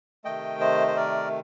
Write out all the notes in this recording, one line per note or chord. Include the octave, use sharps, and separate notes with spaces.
C3 D#3 A3 D#5 G5
C5 D#5
C5
A#4 D5